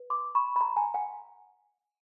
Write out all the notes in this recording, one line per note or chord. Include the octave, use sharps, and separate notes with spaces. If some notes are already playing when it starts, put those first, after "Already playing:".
Already playing: B4
C6 D6
B5 C#6
B5
A#5 C6
G#5 A#5
F#5 G#5